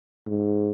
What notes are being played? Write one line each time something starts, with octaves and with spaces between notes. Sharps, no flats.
G#2